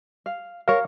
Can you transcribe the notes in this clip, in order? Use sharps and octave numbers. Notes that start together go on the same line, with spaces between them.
F5
A#4 C#5 F5